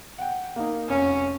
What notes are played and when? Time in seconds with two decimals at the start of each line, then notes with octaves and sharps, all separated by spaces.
0.18 F#5 G5
0.56 A#3 D#4
0.89 F1 C#4